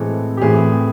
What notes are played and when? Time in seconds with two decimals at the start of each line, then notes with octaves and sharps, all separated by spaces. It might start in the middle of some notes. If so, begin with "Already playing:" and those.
Already playing: A2 E3 G#3 C4 A4
0.37 G4
0.42 A2 E3 A3 C4 G#4